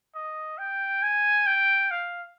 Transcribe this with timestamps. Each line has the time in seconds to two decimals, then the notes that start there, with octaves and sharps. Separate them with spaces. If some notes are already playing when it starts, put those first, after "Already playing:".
0.15 D#5
0.58 G5
1.03 G#5
1.47 G5
1.91 F5